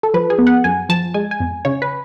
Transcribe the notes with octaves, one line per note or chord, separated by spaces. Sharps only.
A4
F3 B4
G#4
B3
F#5
F#2 G#5
F3 A5
G#3 G#5
G#5
F2
C#3 C#5
B4